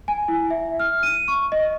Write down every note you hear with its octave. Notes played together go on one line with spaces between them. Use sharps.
G#5
E4
E5
F6
D#7
C#6
D#5